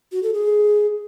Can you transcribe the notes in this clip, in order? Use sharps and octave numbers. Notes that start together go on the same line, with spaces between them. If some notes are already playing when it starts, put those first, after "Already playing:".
F#4
A4
G#4